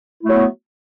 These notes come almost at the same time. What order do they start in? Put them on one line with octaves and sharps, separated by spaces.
E4 A3 F#3 B3